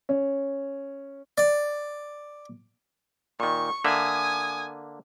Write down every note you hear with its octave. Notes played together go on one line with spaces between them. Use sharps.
C#4
D5
A#2 D#3 C#6
D3 A#3 E5 G#5 D#6